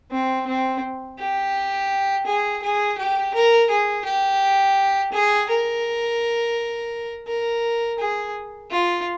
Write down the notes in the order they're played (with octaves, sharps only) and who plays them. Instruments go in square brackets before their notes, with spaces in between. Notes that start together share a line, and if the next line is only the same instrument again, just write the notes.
[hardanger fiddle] C4
C4
G4
G#4
G#4
G4
A#4
G#4
G4
G#4
A#4
A#4
G#4
F4